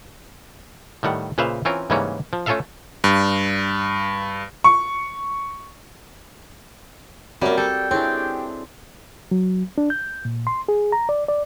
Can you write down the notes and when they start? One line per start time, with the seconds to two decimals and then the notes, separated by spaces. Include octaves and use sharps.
1.03 A2 D#3 G3 F#5
1.38 A#2 C#3 B4 C5 E5 F5
1.65 E3 C4 C#4 F4 A#4
1.90 G#2 C#3 E3 G3 A#3 C#4
2.33 F3
2.46 A3 C#4 F4 A4 E5 F5
3.04 G2
4.64 C#6
7.41 F#2 G3 A#3 C4 F#4
7.58 G3 A4 G5
7.91 C4 D4 E4 G4 G#4 C#5
9.31 F#3
9.78 D4
9.90 G6
10.25 A#2
10.47 C6
10.68 G#4
10.92 A#5
11.09 D5
11.28 D5